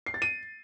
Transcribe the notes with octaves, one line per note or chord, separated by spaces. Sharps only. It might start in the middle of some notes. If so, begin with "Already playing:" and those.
C7
A6
D#7